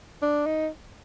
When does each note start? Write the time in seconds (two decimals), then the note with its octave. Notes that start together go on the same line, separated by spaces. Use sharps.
0.22 D4
0.46 D#4